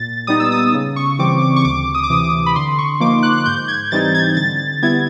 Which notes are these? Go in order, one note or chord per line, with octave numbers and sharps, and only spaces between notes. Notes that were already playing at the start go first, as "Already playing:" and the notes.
Already playing: A#2 A6
G3 B3 D#4 D#6
E6
D#6
C#3
C#6
E3 G3 C4 D6
D6
C#6
D2 D6
D#6
D6
C3 E3 D#6
D6
B5
D3 C6
C#6
F3 A#3 D#4 D6
F#6
F#6
G#2 G6
G#6
E3 G3 C4 D#4 A6
G#6
D3 A6
G3 B3 E4 G#6